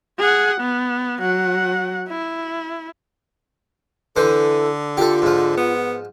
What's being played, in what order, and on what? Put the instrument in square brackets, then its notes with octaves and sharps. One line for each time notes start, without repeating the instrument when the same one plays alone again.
[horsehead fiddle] G#4 F#5
B3
F#3 F#5
E4
[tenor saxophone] D3 [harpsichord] E3 C5 [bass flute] A4
[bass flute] F4 [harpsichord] G4 A4
[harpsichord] G#2 F3
[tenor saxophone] B3